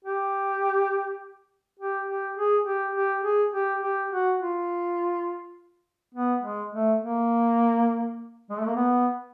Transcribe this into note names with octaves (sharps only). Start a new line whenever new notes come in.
G4
G4
G4
G#4
G4
G4
G#4
G4
G4
F#4
F4
B3
G#3
A3
A#3
G#3
A3
A#3
B3